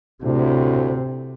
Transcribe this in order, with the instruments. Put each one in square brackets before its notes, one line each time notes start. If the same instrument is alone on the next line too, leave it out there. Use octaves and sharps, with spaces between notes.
[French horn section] D2 A2 [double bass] C3